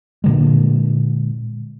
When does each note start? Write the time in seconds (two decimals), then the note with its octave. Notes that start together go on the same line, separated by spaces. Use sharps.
0.24 A#2 D3 G#3